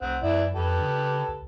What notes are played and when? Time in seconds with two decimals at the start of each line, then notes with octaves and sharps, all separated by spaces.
0.01 C2 C4 F#5
0.23 F#2 E3 E4 D5
0.55 F2 G4 A4 B4
0.81 C#3
1.28 C#2